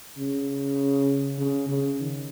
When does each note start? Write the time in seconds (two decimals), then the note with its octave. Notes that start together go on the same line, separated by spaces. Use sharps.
0.18 C#3
1.38 C#3
1.69 C#3
2.00 D#3